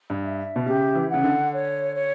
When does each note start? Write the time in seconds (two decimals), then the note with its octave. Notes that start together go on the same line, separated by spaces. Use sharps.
0.10 G2
0.24 E5
0.56 B2
0.66 C#3 G4
0.95 E3
1.09 C#3 F#5
1.24 D3
1.52 C#5
1.95 C#5